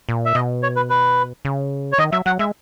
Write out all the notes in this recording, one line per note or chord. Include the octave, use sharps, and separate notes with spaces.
A#2
E5
B2 D#5
C#5
B4
B4
C#3
C#5
D#3 D#5
F#3 E5
F#3 F#5
G#3 E5